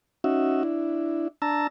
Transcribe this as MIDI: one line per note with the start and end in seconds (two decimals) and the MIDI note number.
0.24 0.63 61
0.24 0.63 63
0.24 0.63 66
0.24 0.63 76
0.63 1.28 62
0.63 1.28 64
1.42 1.67 62
1.42 1.67 81
1.42 1.67 82
1.42 1.67 88